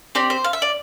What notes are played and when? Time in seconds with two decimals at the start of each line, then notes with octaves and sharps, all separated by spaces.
0.15 C4 G4 D5
0.30 C5
0.44 F5
0.53 E5
0.62 D5